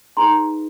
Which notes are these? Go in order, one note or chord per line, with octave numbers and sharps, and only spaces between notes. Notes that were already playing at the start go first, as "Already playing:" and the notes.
D#4 G#4 B4 A#5 C6